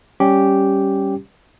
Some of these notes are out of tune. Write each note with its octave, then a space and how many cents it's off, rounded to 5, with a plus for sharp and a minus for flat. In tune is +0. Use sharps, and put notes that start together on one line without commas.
G3 +0 C#4 +0 G4 -5